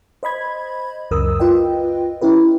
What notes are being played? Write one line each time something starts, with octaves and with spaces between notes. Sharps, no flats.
C5 D#5 B5 G#6
C#2 F#2 A#4 D#6 E6
F4 B4 D#5 G5
C#4 E4 G4 B4